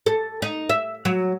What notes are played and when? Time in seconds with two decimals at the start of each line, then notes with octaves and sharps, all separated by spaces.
0.06 A4
0.42 D#4
0.69 E5
1.05 F#3